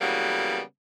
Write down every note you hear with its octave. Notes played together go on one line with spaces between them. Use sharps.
C#3 E3 F#3 G3 A#3 B3